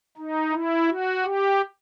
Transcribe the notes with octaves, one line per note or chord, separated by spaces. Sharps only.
D#4
E4
F#4
G4